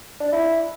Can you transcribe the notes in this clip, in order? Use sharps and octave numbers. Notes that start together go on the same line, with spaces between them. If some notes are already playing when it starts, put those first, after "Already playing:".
D4
E4